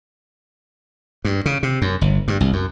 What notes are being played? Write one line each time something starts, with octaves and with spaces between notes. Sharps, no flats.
G2
C#3
C3
F#2
G1
G2
C2
F#2